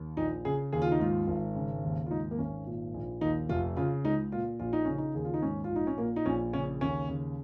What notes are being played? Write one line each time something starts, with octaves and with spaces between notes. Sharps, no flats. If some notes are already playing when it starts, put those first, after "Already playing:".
Already playing: D#2
A#1 D#4
C#3 G#4
D#2 G#4
F4
D#4
G#2 F4
G#1
C#3
D#2
F4
G#2 D#4
A#3
G#1 C#4
A#2
A#1
D#2 D#4
F1 F4
C#3 F4
C#2 D#4
A#2 F4
A#1 F4
D#4
C#3 C#4
D#4
D#2 G#4
F4
D#4
G#2 C#4
F4
A#1 D#4
C#4
A#2 A#3
D#4
A#1 C#4
C#3 C#4
D#2 C#4
C#3